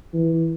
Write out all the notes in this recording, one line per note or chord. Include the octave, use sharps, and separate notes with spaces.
E3